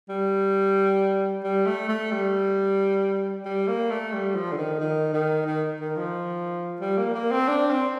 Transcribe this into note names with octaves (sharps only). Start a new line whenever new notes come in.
G3
G3
A3
A3
G3
G3
A#3
A3
G3
F3
D3
D#3
D#3
D#3
D#3
D#3
F3
G3
A#3
A#3
C4
D4
C4